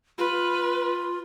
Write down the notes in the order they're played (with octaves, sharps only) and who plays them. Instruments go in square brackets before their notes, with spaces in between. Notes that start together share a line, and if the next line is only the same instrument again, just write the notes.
[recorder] F4 [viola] B4